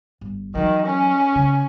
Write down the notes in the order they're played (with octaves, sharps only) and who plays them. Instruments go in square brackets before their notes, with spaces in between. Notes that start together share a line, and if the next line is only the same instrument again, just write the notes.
[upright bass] G1
[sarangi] D#3 [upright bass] E3 F#3
[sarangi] C#4
[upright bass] C#3